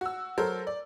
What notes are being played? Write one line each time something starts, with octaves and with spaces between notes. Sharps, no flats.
F#4 E6
F#3 A4 A#4 C5
D5